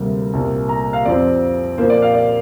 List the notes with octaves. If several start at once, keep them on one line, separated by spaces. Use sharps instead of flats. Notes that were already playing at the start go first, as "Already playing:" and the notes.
Already playing: D2 C3 G3 A#3
C2 A#2 A#3
A#5
F5
F2 F3 C4 D5
A#2 F3 A#3 C5
D5
F5
D5